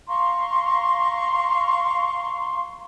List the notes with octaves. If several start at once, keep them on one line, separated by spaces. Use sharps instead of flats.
F5 A#5 C6 C#6